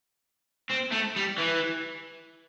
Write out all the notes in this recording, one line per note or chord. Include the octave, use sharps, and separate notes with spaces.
C4
A3
G3
E3